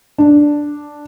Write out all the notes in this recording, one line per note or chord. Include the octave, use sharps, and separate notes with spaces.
D4